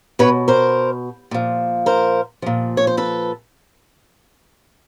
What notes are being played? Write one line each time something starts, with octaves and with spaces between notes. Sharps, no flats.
B2 B4 C#5
A#4 C5
A#2 F3
A#4 C5
A#2 F3
C#5
C5
A4 B4